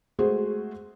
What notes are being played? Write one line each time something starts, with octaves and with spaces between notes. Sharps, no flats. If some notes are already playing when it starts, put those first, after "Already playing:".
G#3 A3 F#4 G#4 C5